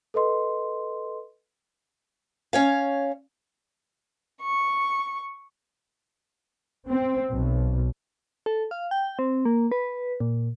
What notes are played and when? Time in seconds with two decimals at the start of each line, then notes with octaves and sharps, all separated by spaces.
0.14 A4 B4 D#5 C6
2.53 C#4 C#5 F5
4.41 C#6
6.88 C4
7.31 B1
8.46 A4
8.71 F5
8.91 G5
9.19 C4
9.45 A#3
9.72 B4
10.20 A#2